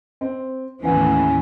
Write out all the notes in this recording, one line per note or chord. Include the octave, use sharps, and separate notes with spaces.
C4
D#2 A2 E3 B3 C#4 F#5